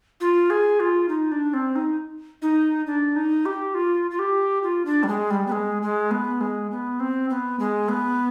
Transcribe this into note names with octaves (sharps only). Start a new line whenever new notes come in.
F4
G#4
F4
D#4
D4
C4
D#4
D#4
D4
D#4
G4
F4
F4
G4
F4
D4
G3
G#3
G3
B3
G#3
G#3
B3
G#3
B3
C4
B3
G#3
B3